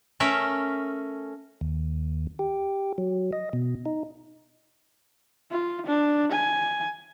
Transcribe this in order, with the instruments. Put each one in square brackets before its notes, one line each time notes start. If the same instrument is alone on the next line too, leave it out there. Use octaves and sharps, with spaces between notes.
[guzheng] A3 C#4 A#4 E5
[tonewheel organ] D#2
G4
F#3
D#5
B2
D#4
[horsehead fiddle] F4
D4
G#5